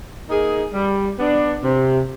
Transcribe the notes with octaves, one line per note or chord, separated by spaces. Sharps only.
A#3 D#4 G#4
G3
B3 D4
C3